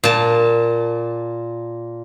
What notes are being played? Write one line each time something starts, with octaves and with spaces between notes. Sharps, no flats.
A#2 A5